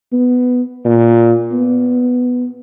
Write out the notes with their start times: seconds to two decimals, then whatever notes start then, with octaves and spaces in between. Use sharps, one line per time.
0.12 B3
0.85 A#2
1.52 B3